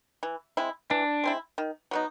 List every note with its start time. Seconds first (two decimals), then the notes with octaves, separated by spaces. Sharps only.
0.23 E3
0.57 G#3 C4 E4
0.90 E3 D4
1.24 G#3 C4 E4
1.58 D#3
1.91 F#3 B3 D#4